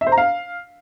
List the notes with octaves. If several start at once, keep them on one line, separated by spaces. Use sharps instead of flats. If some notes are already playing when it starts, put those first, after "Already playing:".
E5
C5
A#5
F5